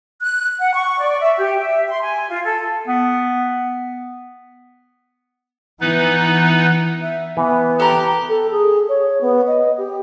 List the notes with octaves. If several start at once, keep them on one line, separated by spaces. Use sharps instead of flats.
F#6
F#5
C#6
D5
E5
G4
E5
C6
G#5
F4
A4
B3
E3 B3 D#4 B4
E5
E3 B3
G4 A4 A#5
A4
G#4
C#5
B3
D#5
G4